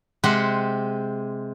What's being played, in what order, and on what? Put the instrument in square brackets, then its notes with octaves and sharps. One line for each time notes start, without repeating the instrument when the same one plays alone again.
[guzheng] C3 G#3 G4 C5 F#5